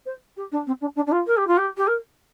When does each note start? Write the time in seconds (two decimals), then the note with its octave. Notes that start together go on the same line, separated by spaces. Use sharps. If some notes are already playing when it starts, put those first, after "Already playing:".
0.06 C5
0.36 G4
0.52 D4
0.67 C4
0.81 D4
0.96 D4
1.06 D4
1.12 F4
1.27 A#4
1.37 G4
1.47 F4
1.57 G4
1.77 G4
1.87 A#4